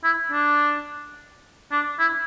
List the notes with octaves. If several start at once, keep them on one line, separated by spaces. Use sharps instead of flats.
E4
D4
D4
E4